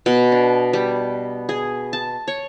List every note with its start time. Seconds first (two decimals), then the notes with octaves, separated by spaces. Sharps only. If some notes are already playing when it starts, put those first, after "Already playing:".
0.06 B2
0.32 D4
0.73 G3
1.49 G#4
1.93 A5
2.28 C#5